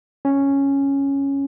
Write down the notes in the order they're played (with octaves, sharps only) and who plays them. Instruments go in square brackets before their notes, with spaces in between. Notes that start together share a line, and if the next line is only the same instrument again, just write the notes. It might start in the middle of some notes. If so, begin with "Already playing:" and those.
[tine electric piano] C#4